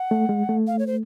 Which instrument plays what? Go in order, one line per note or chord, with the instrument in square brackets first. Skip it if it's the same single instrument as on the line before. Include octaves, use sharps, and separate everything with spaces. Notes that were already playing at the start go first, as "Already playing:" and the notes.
Already playing: [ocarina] F#5
[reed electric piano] A3
G#3
A3
[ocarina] F5
C#5
C5